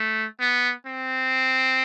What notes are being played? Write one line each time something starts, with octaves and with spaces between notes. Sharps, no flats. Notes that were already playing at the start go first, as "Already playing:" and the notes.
Already playing: A3
B3
C4